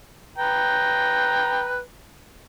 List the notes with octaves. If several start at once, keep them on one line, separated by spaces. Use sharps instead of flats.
B4 G5 A#5